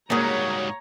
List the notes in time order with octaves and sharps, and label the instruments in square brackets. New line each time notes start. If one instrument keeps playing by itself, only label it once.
[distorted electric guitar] G#2 G3 [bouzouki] C#3 F#3 [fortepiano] A#3 [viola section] C#5 A#5